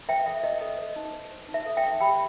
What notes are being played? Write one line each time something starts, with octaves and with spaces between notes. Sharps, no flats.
C5 E5 G5
A4 E5
E4 D#5
A4 D#5
C5
D#4
C5
C5
D#4
E5
A4
E5 G5
D#4
G4 G5 B5